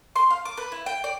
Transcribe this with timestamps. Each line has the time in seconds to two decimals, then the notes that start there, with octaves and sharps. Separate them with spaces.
0.16 C6
0.30 F5
0.45 D6
0.57 B4
0.72 E4
0.86 G5
1.04 D5